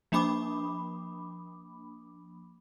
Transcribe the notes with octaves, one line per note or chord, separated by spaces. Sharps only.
F3 A#3 D4 B5 D6 D#6